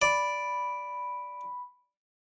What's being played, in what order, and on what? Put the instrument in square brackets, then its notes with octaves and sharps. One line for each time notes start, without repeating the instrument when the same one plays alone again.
[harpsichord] D5 [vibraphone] B5